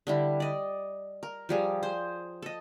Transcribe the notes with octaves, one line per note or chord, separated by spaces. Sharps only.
D3 G3 E4
D5 D#5
A#4
F3 G3 G#4
G#4 C5
A4 D#5